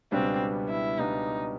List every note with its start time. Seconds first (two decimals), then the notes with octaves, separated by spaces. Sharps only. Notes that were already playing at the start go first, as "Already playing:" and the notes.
0.12 C#2 B2 G3 B3 C4 D4
0.69 E4
0.99 C#2 B2 G3 B3 D4 D#4